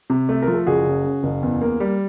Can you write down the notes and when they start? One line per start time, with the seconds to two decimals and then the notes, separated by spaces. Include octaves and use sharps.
0.10 C3
0.29 A3
0.42 A#4
0.48 F3
0.54 A4
0.67 F#1 F#4 G#4
0.85 C#3
1.04 C#3
1.23 F#1
1.42 E2
1.61 A#3
1.80 G3